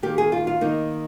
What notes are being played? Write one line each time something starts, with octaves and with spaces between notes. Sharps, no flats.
D#3 A#3 G4
G#4
F4
F4
D#3 A#3 D#4